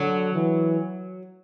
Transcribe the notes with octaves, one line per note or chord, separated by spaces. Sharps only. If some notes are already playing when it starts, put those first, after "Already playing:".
Already playing: D3 F#3
E3